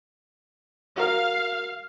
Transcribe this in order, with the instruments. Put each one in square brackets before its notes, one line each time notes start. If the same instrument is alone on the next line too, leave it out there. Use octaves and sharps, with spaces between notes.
[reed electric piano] F#4 A#4 [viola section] F5